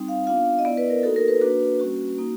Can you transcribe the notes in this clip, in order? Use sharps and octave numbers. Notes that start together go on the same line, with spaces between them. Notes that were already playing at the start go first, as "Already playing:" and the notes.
Already playing: G3 C4 D#4
F5
B3 D4 F4 F5
D#5
B3 E4 D5
B4
A#4
A#3 D#4 F#4 A4
A#4
B4
A#3 D4 F#4 B4
G3 A#3 C#4 F#4
A#3 D#4 F#4